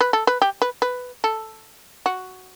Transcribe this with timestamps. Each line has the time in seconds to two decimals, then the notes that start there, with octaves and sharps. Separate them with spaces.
0.01 B4
0.13 A4
0.27 B4
0.42 G4
0.62 B4
0.82 B4
1.24 A4
2.06 F#4